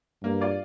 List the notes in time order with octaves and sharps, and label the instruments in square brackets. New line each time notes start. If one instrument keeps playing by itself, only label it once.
[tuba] G2 [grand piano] A#3
[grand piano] F4 D5 F5